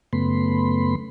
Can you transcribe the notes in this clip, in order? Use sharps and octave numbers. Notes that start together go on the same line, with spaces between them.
F#2 C#3 A3 B3 B5 C6